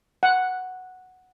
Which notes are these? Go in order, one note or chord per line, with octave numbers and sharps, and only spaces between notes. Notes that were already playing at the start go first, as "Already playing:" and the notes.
F#5